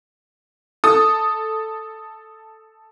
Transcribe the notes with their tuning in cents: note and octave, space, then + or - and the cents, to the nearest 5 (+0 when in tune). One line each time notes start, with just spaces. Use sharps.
A4 +0 D#6 +0